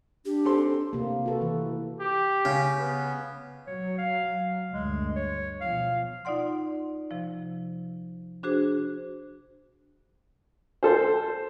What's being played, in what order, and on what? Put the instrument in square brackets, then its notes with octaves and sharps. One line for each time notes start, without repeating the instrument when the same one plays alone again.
[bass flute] D4 [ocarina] G4
[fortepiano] C4 A4 C6
[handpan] C3 A#3
F#4 A4 B4
E3
[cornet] G4
[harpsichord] C#3
[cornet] B3
[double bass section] F#3 [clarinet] C#5
[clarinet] F5
[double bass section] D2 G2 [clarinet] G#3
[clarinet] C#5
[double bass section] B2 F3 [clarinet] F5
[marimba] D#4 F4 D5 F#5 C6
C3 F3
D4 F#4 G#4 C5
[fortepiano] A4 C5